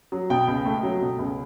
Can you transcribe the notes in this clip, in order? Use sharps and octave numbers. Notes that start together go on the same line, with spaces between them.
F#3
B2 G5
C#2
A3
F#3
B2
C#2